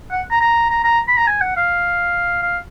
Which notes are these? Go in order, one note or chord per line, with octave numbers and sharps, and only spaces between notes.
F#5
A#5
A#5
A#5
A#5
B5
A#5
G#5
F#5
F5
F5